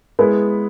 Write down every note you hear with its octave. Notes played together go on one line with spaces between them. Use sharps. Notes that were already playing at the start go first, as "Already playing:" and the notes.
G#3 B3 E4 G#4 B4